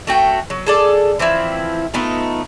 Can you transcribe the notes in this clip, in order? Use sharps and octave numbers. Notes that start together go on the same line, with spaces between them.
A3 F#4 G5
F#3
G#4 A4 D5
E3 F3 C4 E4
A3 B3 D#4 F4